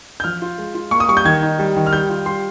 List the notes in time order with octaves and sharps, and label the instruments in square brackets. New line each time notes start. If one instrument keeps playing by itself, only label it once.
[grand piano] G6
F3 F6
F4
G#3
F4
A#3 C#6
D#6
G3 C#6
G6
D#3 G#6
D#4
G3
D#3
F6
G3 G6
F4
G3 C6